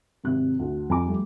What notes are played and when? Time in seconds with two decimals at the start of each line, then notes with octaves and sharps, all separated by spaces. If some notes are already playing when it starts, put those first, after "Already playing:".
0.24 G#1 C3 F#6
0.59 D2
0.90 F2 G#5 A#5 D6
1.06 G3 A3